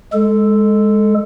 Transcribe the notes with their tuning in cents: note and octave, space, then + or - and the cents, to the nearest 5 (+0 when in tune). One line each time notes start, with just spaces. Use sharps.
G#3 +0 A4 +0